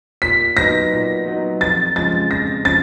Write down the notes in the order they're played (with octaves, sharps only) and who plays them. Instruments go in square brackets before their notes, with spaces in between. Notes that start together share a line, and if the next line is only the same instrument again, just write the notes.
[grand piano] A#2 [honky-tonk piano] B6
[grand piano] F#3 B3 D#4 [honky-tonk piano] A#6
[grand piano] A#2
F#3 B3 D#4
[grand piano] F2 [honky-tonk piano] A6
[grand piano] C#3 F3 G#3 [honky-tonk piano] A6
[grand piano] F2 [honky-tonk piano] A#6
[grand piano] C#3 F3 [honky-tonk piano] A6